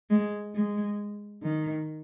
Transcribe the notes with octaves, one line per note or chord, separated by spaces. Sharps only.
G#3
G#3
D#3